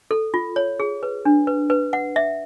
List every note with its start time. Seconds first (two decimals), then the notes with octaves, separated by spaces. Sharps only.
0.11 A4
0.34 F4
0.56 C#5
0.80 G#4
1.03 B4
1.25 D4
1.47 B4
1.70 B4
1.93 F#5
2.16 E5